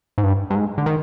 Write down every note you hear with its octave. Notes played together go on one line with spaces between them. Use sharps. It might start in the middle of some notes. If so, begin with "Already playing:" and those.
G#2
G2
G2
G#2
D3
D#3